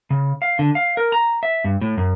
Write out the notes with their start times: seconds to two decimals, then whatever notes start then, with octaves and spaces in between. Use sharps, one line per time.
0.10 C#3
0.42 F5
0.59 D3
0.75 F5
0.97 A#4
1.12 A#5
1.43 E5
1.64 G2
1.81 A2
1.97 F#2